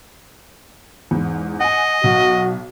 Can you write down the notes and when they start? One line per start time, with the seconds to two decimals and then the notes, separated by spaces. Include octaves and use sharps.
1.11 E2 G#2
1.60 D#5 F#5 G#5
2.04 B1 F#4